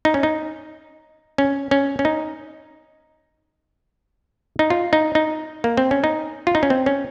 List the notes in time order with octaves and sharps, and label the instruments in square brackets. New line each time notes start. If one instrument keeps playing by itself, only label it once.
[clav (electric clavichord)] D#4
C#4
D#4
C#4
C#4
C#4
D#4
D#4
F4
D#4
D#4
A#3
C4
C#4
D#4
F4
D#4
C#4
C4
C#4